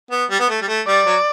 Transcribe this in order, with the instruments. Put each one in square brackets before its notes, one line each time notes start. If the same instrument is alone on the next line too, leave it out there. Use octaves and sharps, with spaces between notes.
[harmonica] B3
G3
B3
A3
G3
A3
[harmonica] G3 [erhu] D5
[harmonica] F#3